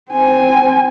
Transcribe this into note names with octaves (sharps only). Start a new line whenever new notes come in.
C4 G#5